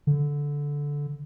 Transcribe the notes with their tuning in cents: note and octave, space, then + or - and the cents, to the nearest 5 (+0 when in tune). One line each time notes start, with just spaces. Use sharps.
D3 -15